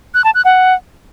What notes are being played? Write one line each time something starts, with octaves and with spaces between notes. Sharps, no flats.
F#6
A5
F#6
F#5